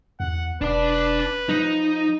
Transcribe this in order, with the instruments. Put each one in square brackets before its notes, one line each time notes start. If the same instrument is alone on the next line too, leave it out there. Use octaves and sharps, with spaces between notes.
[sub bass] E2 [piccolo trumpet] F#5
[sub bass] E1 [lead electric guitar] D4 D5 [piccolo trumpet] B4
[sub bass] F3 [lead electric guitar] D#4